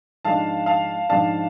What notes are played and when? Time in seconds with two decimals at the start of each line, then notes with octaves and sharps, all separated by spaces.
0.25 G#2 F3 G#3 D4 F4 F5 A5
0.66 F5 A5
1.09 G#2 F3 G#3 D4 F4 F5 A5